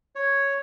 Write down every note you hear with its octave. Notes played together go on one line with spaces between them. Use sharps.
C#5